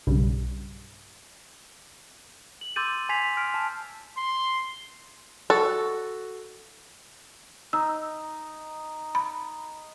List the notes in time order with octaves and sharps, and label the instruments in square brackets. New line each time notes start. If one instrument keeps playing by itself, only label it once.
[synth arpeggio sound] B1 G2 C#3 G3
[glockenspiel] F#7
C6 D6 E6 G6 A6 D#7
G#5 C6 G#6 B6 C7 F7
C6 F6 B6 D7
A5
[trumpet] C6
[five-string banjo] F#4 A4
[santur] D#4 [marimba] E6
[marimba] B5